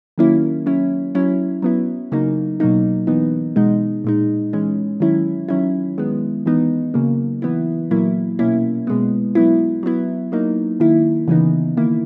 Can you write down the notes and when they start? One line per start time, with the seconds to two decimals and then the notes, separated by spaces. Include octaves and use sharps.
0.18 D#3 F#3 A#3 C#4 E4
0.66 F#3 C#4 E4
1.15 F#3 C#4 E4
1.62 F#3 B3 E4
2.12 C#3 F#3 A#3 D#4
2.60 B2 F#3 A#3 D#4
3.07 E3 B3 D#4
3.56 B2 G#3 D#4
4.04 A#2 G#3 D#4
4.53 E3 G#3 C#4
5.00 D#3 F#3 C#4 E4
5.48 D#3 F#3 C#4 E4
5.98 D#3 G#3 B3
6.46 E3 B3 D#4
6.94 C#3 F#3 A#3
7.42 E3 B3 E4
7.91 A#2 F#3 A#3 E4
8.39 B2 A#3 C#4 E4
8.87 B2 G#3 B3
9.35 F#3 B3 E4
9.83 F#3 B3 E4
10.32 F#3 A#3 D#4
10.80 D#3 A#3 E4
11.28 C#3 E3 B3 D#4
11.77 D#3 A#3 E4